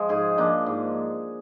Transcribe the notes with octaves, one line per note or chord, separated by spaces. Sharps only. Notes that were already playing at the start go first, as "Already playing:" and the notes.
Already playing: F3 G#3
G#2 G#4
F3 A#3 D4
G#2